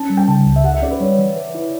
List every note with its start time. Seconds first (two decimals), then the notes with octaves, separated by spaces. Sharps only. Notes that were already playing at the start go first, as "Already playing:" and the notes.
Already playing: C#4 A5
0.10 G3
0.17 G5
0.28 C#3 A5
0.46 C#2
0.56 E5
0.64 G4 F#5
0.74 E5
0.82 C#4 D5
0.91 B4
1.00 G3 C#5
1.19 E3
1.37 B4
1.55 E4